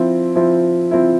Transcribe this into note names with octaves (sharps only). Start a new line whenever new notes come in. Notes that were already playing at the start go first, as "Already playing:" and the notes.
Already playing: F3 C4 E4
F3 C4 E4
F3 C4 E4